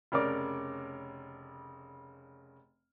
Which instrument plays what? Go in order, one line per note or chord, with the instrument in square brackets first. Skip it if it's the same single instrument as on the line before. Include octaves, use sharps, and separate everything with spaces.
[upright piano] F1 C#3 A#4 C#5 D5 D6